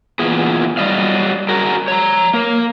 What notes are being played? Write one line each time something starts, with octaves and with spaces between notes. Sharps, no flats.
A#2 E3 B3 G#4
F#3 G3 D5 D#5 F5
F#4 G#4 A#4
C#5 A#5
A#3 A#4